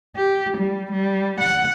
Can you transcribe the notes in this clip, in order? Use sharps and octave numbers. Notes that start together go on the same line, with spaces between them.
G4
G3
G3
F#5